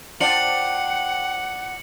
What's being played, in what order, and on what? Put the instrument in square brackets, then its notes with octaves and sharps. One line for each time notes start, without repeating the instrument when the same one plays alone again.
[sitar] D4 F4 C5 [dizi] F#5 [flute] G5 [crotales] C#7 F#7